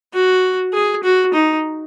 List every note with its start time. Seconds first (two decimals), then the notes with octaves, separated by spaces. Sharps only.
0.14 F#4
0.73 G#4
1.04 F#4
1.34 D#4